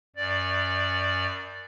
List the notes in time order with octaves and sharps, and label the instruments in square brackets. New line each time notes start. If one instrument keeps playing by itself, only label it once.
[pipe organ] F#2 D5